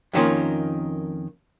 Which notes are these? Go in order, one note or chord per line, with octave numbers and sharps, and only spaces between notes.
F2 D#3 A#3 C#4 F4